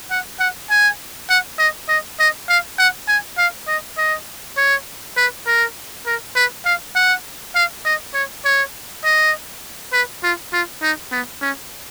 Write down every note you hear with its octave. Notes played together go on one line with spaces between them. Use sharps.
F#5
F#5
G#5
F#5
D#5
D#5
D#5
F5
F#5
G#5
F5
D#5
D#5
C#5
B4
A#4
A#4
B4
F5
F#5
F5
D#5
C#5
C#5
D#5
B4
F4
F4
D#4
B3
C#4